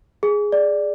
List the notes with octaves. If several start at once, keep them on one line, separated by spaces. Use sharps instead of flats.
G#4
D5